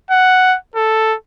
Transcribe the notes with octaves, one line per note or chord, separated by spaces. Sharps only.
F#5
A4